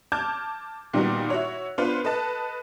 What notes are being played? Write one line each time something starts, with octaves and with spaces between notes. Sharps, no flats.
A5 D6 F6 G6 G#6
A#2 D#3 G3 B3 D#4 F#4
E4 F#4 C#5
B3 D4 F4 B4 C5
A4 B4 D#5 A5